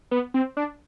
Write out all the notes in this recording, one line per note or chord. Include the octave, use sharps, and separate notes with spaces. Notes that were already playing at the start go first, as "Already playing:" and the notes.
B3
C4
D4